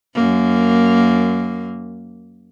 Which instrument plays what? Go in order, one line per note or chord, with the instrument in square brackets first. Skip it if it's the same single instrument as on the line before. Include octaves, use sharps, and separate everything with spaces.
[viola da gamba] F#2 A#3